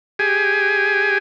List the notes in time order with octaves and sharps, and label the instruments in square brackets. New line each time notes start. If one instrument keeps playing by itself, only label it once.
[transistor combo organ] G4 G#4 G#5